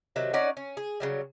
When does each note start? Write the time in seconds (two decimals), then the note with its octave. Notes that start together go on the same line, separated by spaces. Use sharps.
0.16 C3 D#3 F#3
0.33 C#4 D#4 D5 F#5
0.57 C#4
0.77 G#4
1.00 C#3 F#3 G3